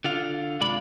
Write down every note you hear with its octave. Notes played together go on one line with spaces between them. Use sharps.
D3 F4 F5
C2 G2 G#3 F4 D5 B5